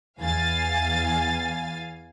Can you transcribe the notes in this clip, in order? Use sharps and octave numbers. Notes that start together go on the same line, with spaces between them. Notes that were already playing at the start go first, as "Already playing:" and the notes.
E2 F5 G#5 A6